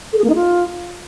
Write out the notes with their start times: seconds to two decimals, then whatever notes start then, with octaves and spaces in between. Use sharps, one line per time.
0.13 A4
0.18 G#4
0.24 A#3
0.29 D#4
0.35 F4